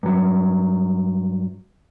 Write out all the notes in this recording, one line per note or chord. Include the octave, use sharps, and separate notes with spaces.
G2 F#3